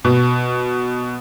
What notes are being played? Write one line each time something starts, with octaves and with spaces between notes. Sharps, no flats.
B2